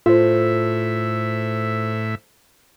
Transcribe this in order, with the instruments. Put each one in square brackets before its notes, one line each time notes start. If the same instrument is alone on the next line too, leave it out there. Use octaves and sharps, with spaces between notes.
[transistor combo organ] A2 E5 [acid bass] F4 [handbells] A4 C5